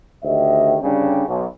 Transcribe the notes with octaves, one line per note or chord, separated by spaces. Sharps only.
D2 D#3 G4 D#5 E5
G1 C#3 G3 C#4 D4 G5
B1